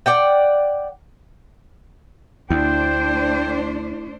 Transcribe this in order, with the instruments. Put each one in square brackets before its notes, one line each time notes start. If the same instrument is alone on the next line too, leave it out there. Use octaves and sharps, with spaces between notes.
[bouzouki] D5 F#5 G5
[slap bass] D2 [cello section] A3 D4 C5 [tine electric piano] E4 [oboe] G5